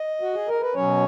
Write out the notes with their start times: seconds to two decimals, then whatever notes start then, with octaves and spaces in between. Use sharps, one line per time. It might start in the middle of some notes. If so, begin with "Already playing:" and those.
Already playing: D#5
0.21 F#4
0.34 G#4
0.48 A#4
0.61 B4
0.75 B2 F#3 C#4 C#5